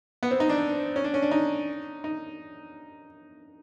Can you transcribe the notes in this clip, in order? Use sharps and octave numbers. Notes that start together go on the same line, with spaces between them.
B3
C4
D#4
D4
C#4
D4
C#4
D4
D#4
D#4